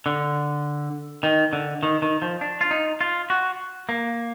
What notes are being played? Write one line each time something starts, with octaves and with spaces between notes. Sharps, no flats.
D3
D#3
D3
D#3
D#3
F3
D4
F4
D#4
F4
F#4
A#3